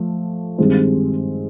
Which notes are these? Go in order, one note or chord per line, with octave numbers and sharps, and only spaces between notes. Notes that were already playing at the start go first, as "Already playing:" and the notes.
Already playing: F3 A3
G2 D#3 G#3 C4